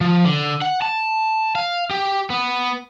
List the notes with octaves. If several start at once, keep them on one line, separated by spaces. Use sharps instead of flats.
F3
D3
F#5
A5
F5
G4
B3